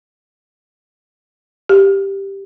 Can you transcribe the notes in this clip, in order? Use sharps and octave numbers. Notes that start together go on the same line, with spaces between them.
G4